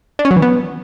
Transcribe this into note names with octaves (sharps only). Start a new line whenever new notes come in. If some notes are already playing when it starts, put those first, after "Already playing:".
D4
C#4
F#3
E3
B3